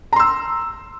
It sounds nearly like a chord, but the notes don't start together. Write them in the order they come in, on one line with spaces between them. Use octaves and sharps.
A#5 C6 E6